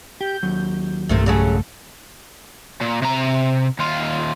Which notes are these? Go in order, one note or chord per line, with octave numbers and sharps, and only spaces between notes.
G4 G6
D#2 F#3
B1 E2 G2 C3 D#3 A3
C#2 C#3 F#3 A3 G#4 A4
A#2
C3 A#5
D#2 F4